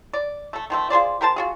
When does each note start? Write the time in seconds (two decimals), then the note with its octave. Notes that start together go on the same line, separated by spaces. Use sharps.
0.13 D5
0.53 A3 A4
0.70 D#3 F3 A3
0.90 F4 G#4 C5 D5
1.21 G4 A#4 C5 A5
1.36 F4 F#4 G#4